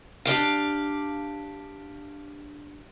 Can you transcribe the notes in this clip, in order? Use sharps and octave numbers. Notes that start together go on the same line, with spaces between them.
D4 G4 F5